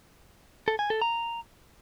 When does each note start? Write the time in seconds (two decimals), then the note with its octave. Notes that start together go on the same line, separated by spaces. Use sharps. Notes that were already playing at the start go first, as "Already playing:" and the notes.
0.68 A4
0.79 G#5
0.90 A4
1.02 A#5